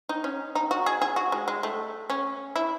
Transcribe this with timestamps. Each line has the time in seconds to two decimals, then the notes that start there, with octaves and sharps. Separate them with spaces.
0.09 D#4
0.24 C#4
0.55 D#4
0.71 F#4
0.86 G#4
1.01 G#4
1.16 F#4
1.32 G#3
1.48 G#3
1.63 A3
2.10 C#4
2.56 E4